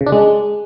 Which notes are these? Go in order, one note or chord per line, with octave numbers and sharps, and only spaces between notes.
C#3
D4
G#3